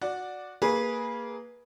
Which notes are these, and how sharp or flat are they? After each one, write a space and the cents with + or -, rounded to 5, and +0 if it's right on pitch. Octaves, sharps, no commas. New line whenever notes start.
F#4 -15 D5 +0
A#3 -10 G#4 +0 B4 -20